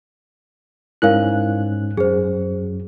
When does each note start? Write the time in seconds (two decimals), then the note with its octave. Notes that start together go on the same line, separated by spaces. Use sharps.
1.02 G#2 C#4 E4 A#4 F5 F#6
1.97 F#2 G#4 C5